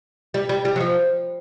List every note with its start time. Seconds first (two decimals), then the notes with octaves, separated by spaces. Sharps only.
0.34 G3
0.49 G3
0.65 G3
0.76 F#3
0.80 F3